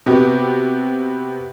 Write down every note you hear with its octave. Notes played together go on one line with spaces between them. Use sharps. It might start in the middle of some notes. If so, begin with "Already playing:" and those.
C3 B3 F#4 G4